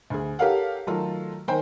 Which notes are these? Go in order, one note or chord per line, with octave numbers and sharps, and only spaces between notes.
D2 G#4
G4 A4 A#4 C#5 F5 F#5
D#3 F#3 A3 F4 A4
D#3 C5 G5 G#5